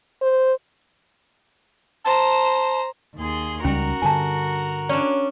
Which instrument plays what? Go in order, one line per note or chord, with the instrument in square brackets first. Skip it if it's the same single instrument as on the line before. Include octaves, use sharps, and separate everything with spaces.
[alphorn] C5
[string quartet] C5 A#5 [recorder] A5
[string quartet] D#2 G#4 C6
[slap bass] C#2 G3 [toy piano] C#4 [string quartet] F#4 A#4
[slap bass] G2 D3 [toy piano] G#5 A5
[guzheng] C#4 D4 [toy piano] D5